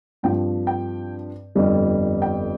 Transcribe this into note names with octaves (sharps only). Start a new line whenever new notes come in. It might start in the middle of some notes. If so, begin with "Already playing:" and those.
G2 F3 C4 G5
G5
G1 F2 D3 G3
G5